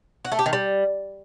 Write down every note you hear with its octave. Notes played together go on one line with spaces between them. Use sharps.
F#4
A3
G4
D#3
G3